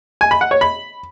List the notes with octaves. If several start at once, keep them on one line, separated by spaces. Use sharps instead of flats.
G#5
B5
F#5
C#5
B5